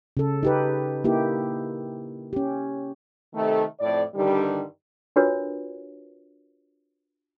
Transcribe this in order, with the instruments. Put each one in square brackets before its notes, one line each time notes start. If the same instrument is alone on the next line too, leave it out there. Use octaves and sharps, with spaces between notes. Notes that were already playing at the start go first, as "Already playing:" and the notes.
[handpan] C#3 A4
D#4 G4 B4
A#3 D#4 E4 G4
C#4 G4
[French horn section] C3 D#3 A3
F2 A2 D5
G2 D3 D#3 G3
[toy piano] D4 F4 F#4 A#4 B4 C#5